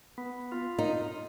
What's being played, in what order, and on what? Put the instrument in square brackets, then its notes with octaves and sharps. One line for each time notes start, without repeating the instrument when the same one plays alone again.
[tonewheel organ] B3
F4
[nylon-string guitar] D#4